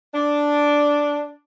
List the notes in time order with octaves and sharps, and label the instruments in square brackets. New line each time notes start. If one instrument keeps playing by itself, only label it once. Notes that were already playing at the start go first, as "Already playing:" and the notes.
[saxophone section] D4